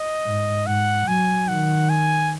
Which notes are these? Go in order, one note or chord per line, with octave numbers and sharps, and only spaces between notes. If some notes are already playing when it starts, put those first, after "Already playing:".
Already playing: D#5
G#2
G#2 F#5
F#3 G#5
D#3 F#5
G#5